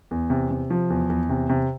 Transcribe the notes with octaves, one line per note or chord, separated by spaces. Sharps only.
E2
C3
C3
F3
E2
E2
C3
C3